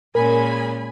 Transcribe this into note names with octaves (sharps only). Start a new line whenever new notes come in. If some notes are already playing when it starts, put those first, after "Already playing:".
A#2 G#3 C#4 A#4 G#5 B5